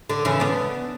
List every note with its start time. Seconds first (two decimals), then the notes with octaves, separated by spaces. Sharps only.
0.09 D3
0.25 C#3 E3
0.40 B3 D4